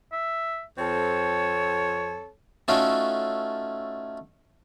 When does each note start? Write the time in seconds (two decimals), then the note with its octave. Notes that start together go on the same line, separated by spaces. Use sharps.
0.12 E5
0.78 F2 C4 A4 C#5
2.68 A3 C#4 D#4 F4 F#4 A4